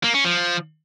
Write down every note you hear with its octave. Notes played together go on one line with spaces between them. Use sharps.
A#3
C#4
F3